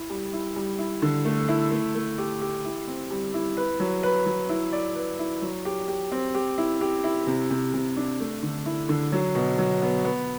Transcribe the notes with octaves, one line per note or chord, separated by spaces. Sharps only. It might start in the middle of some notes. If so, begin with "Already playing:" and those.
Already playing: E4
G3
E4
G3
E4
D3
A3
E4
A3
A3
G4
G4
E4
C4
G3
E4
B4
F#3
B4
F#3
E4
D5
B4
E4
F#3
G4
G4
C4
G4
E4
G4
E4
C3
C3
C3
D4
A3
D3
E4
D3
F#3
B2
F#3
B3
B3